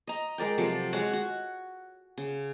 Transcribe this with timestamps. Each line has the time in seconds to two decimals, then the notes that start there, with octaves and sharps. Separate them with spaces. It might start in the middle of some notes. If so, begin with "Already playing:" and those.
0.07 D#5 A#5
0.38 G#3 A#4 D5 G5
0.58 C3 F3 F#3 A4
0.93 G#3 F#4 C#5 F#5
1.13 F#4
2.18 C#3